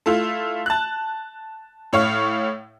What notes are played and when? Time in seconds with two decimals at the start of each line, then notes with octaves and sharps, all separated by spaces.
0.06 A3 E4 F4
0.66 A5 F#6
1.93 A2 C#5 F5 F6